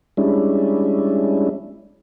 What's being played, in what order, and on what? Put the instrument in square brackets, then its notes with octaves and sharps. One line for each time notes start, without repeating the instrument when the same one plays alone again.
[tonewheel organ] G3 G#3 C#4 D4 E4